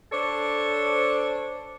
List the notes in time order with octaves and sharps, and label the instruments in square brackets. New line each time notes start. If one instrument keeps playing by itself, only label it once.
[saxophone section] D4 A4 C5 C#5